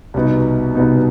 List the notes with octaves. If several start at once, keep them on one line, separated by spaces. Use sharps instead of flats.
C2 B2 B3 D#4
C2 B2 B3 D#4